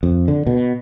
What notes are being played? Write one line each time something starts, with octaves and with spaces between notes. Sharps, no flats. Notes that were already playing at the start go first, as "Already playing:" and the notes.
F2
D3
B2